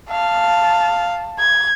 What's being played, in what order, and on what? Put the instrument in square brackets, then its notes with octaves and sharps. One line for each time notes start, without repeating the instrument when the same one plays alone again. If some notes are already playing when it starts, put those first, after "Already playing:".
[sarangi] F5 [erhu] A5
[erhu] G#6